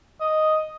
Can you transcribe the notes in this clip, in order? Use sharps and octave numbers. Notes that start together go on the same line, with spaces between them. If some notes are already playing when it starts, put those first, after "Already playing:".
D#5